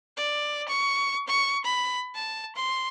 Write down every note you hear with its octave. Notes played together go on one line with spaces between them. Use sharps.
D5
C#6
C#6
B5
A5
C6